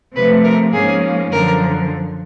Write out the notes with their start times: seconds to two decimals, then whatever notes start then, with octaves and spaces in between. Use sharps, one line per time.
0.14 C3 F3 A3 B4
0.44 A#4
0.73 G#2 F3 A#3 C#4 G#4
1.31 F#2 D3 F3 A#4